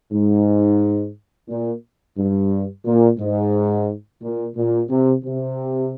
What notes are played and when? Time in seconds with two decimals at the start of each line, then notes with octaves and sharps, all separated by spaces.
0.12 G#2
1.49 A#2
2.17 G2
2.85 A#2
3.19 G#2
4.22 A#2
4.56 A#2
4.89 C3
5.24 C3